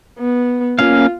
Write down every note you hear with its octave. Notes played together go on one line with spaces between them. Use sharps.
B3
A#3 C#4 F4 F5